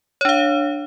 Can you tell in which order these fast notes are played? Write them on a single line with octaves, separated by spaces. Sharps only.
C#5 D4 F5